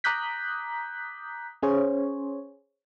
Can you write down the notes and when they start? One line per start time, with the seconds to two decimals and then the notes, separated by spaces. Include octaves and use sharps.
0.04 A#5 D6 D#6 F#6 G6 B6
1.63 C#4 G#4 C5 C#5